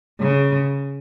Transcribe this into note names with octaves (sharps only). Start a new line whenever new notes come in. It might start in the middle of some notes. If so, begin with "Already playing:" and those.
C#3